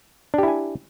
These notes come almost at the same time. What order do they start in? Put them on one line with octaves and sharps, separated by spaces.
D4 G4 E4 G#5